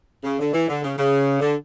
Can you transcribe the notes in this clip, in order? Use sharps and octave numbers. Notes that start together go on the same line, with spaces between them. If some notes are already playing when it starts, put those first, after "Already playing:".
C#3
D3
E3
D3
C#3
C#3
D3